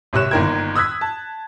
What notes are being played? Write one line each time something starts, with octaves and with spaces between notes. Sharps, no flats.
G#1 C3 C#5 F#6 E7
G1 D#3 A#3 A#4 G5 G#6
D#6 E6 F#6 G#6 B6
A5